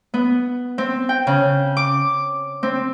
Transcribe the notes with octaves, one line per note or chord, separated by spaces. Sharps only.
B3
C4
G5
C#3
D6
C4